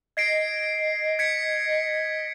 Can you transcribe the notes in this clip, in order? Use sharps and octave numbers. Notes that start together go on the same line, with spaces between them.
D#5 G#6 C7 D7
G#6 B6 C#7